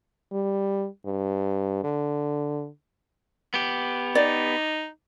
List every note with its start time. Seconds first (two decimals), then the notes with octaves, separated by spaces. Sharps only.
0.32 G3
1.06 G2
1.84 D3
3.54 B3 G4
4.15 D#4 D5